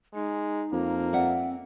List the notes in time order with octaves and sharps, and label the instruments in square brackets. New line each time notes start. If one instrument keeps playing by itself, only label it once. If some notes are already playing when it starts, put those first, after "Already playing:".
[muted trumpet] G#3 [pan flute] D#4
[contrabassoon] F2 [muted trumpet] A#3
[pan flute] C4 [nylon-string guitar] D5 E5 F#5